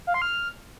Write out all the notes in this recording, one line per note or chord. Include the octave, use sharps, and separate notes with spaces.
F5
C6
F6